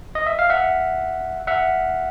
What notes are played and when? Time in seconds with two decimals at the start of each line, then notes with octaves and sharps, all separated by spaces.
0.15 D#5
0.27 E5
0.39 F5
0.50 E5 F#5
1.47 E5 F#5